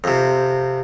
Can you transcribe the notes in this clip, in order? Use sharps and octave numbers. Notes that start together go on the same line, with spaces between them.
F2 C3